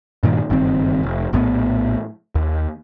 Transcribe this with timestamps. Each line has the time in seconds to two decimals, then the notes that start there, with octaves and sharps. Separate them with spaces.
0.23 G2 A#2 D#3
0.50 F#1 G2 D#3 C4
1.03 F1
1.33 A#1 A2 F3 B3
2.35 D#2